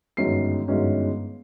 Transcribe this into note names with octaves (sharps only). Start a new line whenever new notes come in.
G1 F#2 D#3 G#3 C#4 C7
G1 F#2 D#3 G#3 C#4